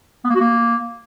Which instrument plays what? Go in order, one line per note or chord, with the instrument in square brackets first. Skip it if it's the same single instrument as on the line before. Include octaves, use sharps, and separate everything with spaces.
[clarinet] B3
A#3
F#4
A#3